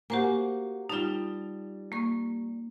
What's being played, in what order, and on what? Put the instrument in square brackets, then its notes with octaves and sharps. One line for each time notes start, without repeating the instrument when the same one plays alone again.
[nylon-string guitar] A#3 F#4 [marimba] G4 C5 G#5
[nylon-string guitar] G3 A5 [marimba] D#4 F4
[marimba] A#3 C#6